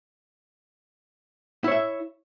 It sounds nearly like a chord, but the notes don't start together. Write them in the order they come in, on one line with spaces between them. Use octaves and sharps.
E4 C#5 E5